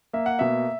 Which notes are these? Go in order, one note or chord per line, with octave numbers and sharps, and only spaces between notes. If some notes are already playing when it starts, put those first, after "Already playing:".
A#3 E5
F#5
B2 E5